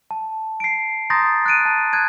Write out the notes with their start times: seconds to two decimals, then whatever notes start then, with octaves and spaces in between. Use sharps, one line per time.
0.11 A5
0.60 C7 D7
1.10 A#5 C6 D#6 G6 A6 A#6
1.46 F#6 A6 D7 D#7
1.65 A5
1.93 F#6 G#6 D#7